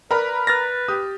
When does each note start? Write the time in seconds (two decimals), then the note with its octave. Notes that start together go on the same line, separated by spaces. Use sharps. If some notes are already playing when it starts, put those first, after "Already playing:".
0.11 A#4 B4 D5 B5
0.47 B4 F6 A6 A#6
0.88 G4 D#6